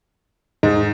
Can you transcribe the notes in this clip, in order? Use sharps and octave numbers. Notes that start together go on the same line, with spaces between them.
G#2 D#4